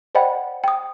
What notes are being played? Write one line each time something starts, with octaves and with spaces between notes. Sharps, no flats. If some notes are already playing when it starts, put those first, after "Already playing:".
C5 D5 D#5 F#5 G5 B5
G5 D#6